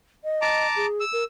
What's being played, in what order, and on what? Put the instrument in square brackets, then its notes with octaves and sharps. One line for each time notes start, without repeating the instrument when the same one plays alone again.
[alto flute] D#5
[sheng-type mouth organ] A5 A#5 D6
[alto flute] G#4
[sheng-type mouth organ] E6
[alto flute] A#4